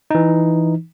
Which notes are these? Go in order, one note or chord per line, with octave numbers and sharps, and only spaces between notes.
E3 D#4